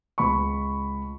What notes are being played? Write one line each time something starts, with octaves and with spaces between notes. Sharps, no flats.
C#2 B5 C#6